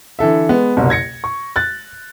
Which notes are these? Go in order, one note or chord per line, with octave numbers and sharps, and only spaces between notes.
D3 E3 A4 E5
G#3 B3
F#1 C2 B2
G#6 A#6 C#7
C#6
F#6 A6